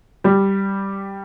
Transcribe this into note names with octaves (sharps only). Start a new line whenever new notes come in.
G3 G4